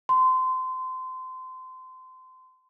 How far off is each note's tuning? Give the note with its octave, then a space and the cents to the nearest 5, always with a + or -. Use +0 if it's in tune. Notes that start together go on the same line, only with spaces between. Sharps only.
C6 -25